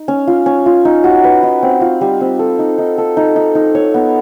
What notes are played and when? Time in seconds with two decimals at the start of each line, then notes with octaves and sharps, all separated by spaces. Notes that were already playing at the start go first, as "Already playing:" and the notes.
Already playing: D#4
0.08 C#4
0.27 F4
0.46 C#4
0.66 F4
0.85 D#4
1.04 F#4
1.24 B4
1.43 D#4
1.63 C4
1.81 F4
2.01 G3
2.21 C4
2.39 A4
2.59 D#4
2.78 D#4
2.98 A4
3.17 D#4
3.36 D#4
3.55 D#4
3.75 C#5
3.94 B3